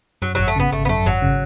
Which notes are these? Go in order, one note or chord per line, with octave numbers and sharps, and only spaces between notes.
F#2 F#3
G#1 F#3
A3
C#3 B3
G#1 A3
B3
F#2 A3
G#1 F#3
C#3